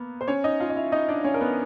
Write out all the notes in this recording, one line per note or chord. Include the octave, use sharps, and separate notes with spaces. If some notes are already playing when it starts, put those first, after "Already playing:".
Already playing: A#3 B3
C5
C#4 C#5
D#4 D#5
F4 F5
D#5
E4 E5
D#4 D#5
D4 D5
C#4 C#5
A#4
B3 B4